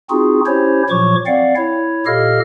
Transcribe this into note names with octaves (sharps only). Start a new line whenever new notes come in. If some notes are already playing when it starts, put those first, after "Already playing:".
C4 D#4 F4 F#4 G#4
C#4 E4 G4 C5 C#5
A#2 F3 F#3 C#5 C#6 D6
C4 D5 F5 F#5
E4 C#5
A#2 G4 A4 D#5 F5 F6